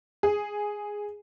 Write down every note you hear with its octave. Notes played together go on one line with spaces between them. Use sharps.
G#4